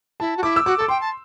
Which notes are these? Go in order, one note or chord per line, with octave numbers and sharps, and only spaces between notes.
E4 A5
F#4
E4 D6
E6
F#4 D6
A4
D6
G5 C6
A5